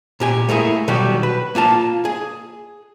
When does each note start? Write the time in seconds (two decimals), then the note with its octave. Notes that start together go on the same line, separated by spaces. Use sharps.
0.20 A#2 G4 G#5
0.49 A3 A#3 E4 G#4
0.88 B2 D#3 F#3 G3 F#4 G4
1.23 B4
1.55 A#3 F4 F5 A5
2.05 G#4